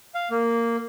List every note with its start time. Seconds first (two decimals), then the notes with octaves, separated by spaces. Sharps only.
0.15 F5
0.30 A#3